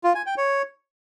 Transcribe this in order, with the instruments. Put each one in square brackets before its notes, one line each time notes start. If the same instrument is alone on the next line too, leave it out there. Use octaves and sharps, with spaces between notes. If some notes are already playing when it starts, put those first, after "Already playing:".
[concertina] F4
G#5
G5
C#5